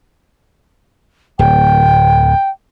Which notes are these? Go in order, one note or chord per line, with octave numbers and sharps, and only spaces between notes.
D1 G5